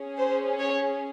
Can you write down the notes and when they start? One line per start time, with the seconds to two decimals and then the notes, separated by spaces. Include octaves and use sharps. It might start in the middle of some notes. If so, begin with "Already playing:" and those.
Already playing: C#4 G#4
0.18 C5
0.60 C#5